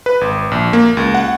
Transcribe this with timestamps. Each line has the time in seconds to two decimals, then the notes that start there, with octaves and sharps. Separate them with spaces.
0.06 B4
0.21 G#1
0.51 A#1
0.73 A#3
0.97 C#2
1.14 F#5